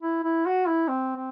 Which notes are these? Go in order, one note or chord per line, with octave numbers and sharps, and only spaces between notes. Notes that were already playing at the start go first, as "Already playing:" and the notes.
E4
E4
F#4
E4
C4
C4